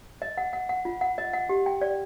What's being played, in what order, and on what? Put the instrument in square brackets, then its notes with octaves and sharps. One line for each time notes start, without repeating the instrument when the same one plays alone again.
[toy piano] D#5
F#5
F#5
F#5
F4
F#5
D#5
F#5
G4
G5
D5